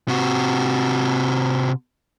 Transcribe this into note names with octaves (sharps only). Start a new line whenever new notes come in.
C3 F#4